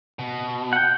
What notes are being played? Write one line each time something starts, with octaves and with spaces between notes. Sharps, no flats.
B2
F#5 G5